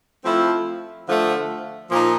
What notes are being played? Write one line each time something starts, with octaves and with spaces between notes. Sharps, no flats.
F3 A3 C4 E4
D3 F3 A3
A#2 F3 A#3 D#4